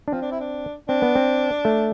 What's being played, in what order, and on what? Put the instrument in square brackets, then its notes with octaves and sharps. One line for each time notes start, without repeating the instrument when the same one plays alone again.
[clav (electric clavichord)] D4
[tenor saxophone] F3 [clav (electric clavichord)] C4
[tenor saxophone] D4
E4
D4
[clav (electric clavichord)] C4 [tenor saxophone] D4
[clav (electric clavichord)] B3
C4
A3